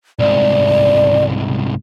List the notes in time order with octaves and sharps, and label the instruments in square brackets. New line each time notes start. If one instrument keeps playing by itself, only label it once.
[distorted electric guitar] C2 G#2 [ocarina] D5